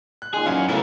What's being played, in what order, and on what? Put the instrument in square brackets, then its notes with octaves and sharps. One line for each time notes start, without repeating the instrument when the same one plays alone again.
[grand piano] F#6
[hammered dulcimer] A#2 D#3 G#3 [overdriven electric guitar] G#4
[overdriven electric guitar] F#2 C#4 [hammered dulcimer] E3 F#3 [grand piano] F5 G#5
[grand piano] C#3 A3 B3 [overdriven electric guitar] E4 A#4